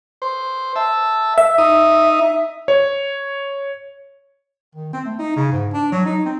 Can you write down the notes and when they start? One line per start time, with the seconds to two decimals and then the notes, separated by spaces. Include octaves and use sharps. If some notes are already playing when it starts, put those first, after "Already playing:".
0.22 C5
0.76 E5 A5
1.38 E5
1.58 D#4 D#6
2.68 C#5
4.75 D#3
4.93 C4
5.05 A3
5.19 D#4
5.36 C#3
5.52 G#2
5.73 D4
5.92 F#3
6.05 D#4
6.25 C4